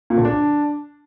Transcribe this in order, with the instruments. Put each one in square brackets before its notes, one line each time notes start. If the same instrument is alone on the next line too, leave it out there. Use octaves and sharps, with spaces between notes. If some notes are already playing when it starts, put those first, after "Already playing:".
[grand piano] A#2
D3
D4